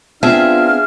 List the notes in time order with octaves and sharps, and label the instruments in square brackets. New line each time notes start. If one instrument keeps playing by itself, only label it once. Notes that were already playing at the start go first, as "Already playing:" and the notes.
[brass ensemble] B3 D4 F4 [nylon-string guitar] C4 A5 [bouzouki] G#4 E5 [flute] F6